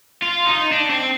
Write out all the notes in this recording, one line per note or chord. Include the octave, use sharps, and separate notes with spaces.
F4
D#4
D4
C4